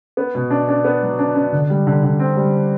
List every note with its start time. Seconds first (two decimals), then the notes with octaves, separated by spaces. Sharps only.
0.17 B3
0.35 B2
0.50 D4
0.69 D4
0.85 B3
1.02 F#3
1.19 D4
1.35 D4
1.52 D3
1.70 G3
1.87 D3
2.03 D3
2.19 C4
2.37 G3